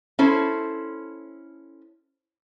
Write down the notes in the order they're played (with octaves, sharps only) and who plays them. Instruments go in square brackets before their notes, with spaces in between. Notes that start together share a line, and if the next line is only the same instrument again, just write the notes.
[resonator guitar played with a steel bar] C#4 E4 A4 C5